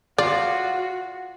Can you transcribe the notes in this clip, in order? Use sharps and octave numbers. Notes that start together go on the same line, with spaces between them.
F4 F#4 D5 F5